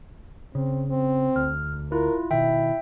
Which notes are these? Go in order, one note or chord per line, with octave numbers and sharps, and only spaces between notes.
C#3 C4
C4
D2 F6
E4 F4 A#4
B2 D#3 E4 E5 G5